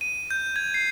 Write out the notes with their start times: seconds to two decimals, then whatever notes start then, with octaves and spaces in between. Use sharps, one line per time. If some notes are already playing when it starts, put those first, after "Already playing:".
0.01 D#7
0.31 G6
0.56 G#6
0.74 C7